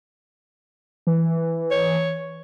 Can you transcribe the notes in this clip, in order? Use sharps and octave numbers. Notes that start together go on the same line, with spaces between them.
E3
C#5